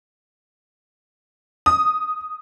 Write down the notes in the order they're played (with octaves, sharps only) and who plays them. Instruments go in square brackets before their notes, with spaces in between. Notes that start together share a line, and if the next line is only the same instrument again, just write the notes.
[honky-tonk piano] D#6